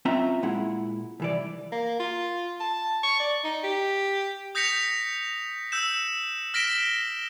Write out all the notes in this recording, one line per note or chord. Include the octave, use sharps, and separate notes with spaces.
C4 C#4 F4 D#5 E5 A#5
A#2 G#3 E4 F#5
C2 E3 D5
A#3
F4
A5
C#6
D5
D#4
G4
D#6 G6 A#6 B6 C#7 F7
E6 G6 E7
F6 A#6 B6 D7 E7 G7